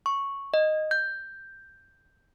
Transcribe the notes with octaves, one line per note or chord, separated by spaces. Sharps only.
C#6
D#5
G6